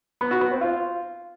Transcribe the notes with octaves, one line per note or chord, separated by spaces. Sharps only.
B3
F#4
B3
C4
F4